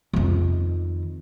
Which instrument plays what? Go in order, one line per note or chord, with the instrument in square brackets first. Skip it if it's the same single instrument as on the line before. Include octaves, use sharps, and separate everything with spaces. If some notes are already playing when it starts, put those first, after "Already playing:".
[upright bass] F2 D#3